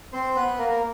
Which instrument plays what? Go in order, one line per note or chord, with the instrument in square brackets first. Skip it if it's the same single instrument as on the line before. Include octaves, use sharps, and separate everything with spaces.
[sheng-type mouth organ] C4 C5
B3 B4
A#3 A#4
A#4